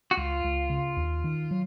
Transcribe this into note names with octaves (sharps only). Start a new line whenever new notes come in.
F#4
C#2 F4
C#2
C#3
D#2
D#3
F#3